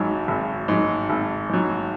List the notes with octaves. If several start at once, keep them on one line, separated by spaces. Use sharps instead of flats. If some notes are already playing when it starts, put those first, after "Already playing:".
Already playing: G#1 G#2 F#3
G#1
G#2 F#3
G#1
G#2 F#3